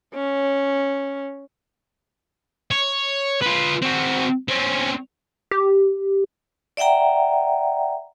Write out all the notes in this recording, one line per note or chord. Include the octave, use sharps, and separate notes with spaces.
C#4
C#5
F4 B4
C4 F#4
C4 C#4
G4
D5 E5 F#5 G5 A#5